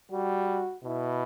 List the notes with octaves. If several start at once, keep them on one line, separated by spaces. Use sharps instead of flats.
G3 F#4
B2 E4